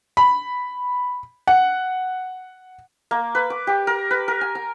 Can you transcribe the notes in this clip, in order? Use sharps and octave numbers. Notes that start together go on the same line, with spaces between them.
B5
F#5
A#3
B4
D6
G4
A#4
B4
A#4
G#5
A#5